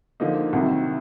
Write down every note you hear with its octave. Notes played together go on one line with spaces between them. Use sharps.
D3 F3 A#3 D#4
C2 C3 D#3 F#3